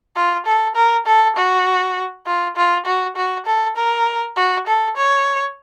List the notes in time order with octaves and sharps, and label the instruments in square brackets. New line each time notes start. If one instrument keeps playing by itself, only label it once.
[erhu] F4
A4
A#4
A4
F#4
F4
F4
F#4
F#4
A4
A#4
F#4
A4
C#5